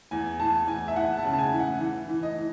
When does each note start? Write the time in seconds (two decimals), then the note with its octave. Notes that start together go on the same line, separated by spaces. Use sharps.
0.11 E2 G#5
0.40 E3 A5
0.68 E2 G#5
0.88 E5
0.96 E2 F#5
1.17 A5
1.24 C#3
1.33 A5
1.38 G#5
1.52 E3
1.59 F#5
1.80 E3
2.09 E3
2.23 D#5
2.37 E3